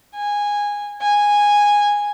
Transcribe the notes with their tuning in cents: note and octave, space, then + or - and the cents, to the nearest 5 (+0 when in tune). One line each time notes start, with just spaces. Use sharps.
G#5 -15
G#5 -10